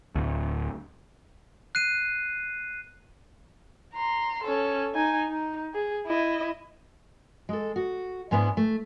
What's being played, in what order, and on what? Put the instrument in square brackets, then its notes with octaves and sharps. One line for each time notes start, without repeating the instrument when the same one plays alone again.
[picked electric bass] D1 D2
[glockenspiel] F#6 C7 D#7
[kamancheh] A#5 C6
C#4 A4
D#4 G#5
D#4
G#4
E4 D#5
[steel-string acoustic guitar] G#3 A4
F#4
G#2 G#3 B3 D4 E4
A3